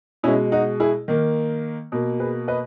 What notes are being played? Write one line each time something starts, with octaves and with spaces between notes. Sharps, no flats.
B2 G#3 C#4 E4
D#4 F#4
E4 G#4
D#3 A#3
B2 A#3
G#4 B4
B4 D#5